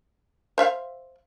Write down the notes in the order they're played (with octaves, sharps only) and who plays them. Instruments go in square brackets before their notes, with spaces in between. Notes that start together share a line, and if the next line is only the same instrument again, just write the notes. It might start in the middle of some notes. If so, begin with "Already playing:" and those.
[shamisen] C5 E5 F5